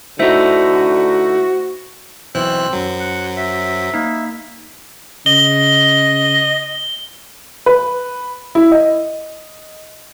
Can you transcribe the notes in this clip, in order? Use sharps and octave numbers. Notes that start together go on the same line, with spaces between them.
D3 A3 D#4 E4 F#4 C5 E5
B1 E3 C4 C5 E6 F#6
F#2 F#3
F#5
E5
A#3 D#4
C#3 D#5 G7
B4
E4
D#5